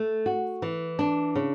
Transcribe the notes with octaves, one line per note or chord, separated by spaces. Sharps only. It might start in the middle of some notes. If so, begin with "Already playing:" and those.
Already playing: A3
F#4
E3
D4
C#3